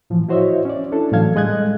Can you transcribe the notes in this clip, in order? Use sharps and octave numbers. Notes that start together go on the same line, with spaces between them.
A2 E3 F3
E4 F#4 C5 C#5 D#5 E5
C#4 D5
C#4 D4 E4 A4
A2 E3 F#3 A4 F5 G#6
G3 G#3 D#5 F#6 G#6